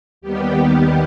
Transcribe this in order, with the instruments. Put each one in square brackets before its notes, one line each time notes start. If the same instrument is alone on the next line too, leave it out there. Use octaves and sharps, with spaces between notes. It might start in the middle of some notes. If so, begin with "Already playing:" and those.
[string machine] D#2 D#3 G3 B3 G4